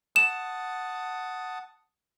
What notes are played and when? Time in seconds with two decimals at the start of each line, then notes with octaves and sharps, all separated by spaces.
0.16 F#5 A5 D#6 E7